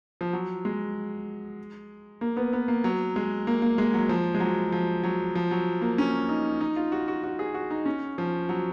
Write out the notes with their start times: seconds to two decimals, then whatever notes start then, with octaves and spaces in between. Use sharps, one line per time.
0.21 F3
0.33 F#3
0.65 G#3
2.21 A#3
2.37 B3
2.53 B3
2.68 A#3
2.84 F#3
3.16 G#3
3.47 A#3
3.62 A#3
3.78 G#3
3.94 F#3
4.09 F3
4.35 G#3
4.40 F#3
4.72 F3
5.04 F#3
5.35 F3
5.51 F#3
5.82 A#3
5.98 C#4
6.29 D#4
6.61 D#4
6.76 F4
6.92 F#4
7.08 F#4
7.24 F#4
7.39 G#4
7.54 F#4
7.70 D#4
7.86 C#4
8.18 F3
8.49 F#3